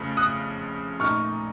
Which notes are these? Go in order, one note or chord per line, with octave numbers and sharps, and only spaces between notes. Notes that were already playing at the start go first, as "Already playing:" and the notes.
Already playing: F2 C#3 F3 A3
D#6 F#6
A#2 A3 D#4 C#6 F6